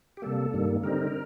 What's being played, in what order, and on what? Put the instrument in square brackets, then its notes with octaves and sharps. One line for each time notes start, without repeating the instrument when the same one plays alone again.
[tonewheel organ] G4
C3 G3 A#3 A4
G2 D#3 G3 A#3
D3 G3 C4 D#4 A#4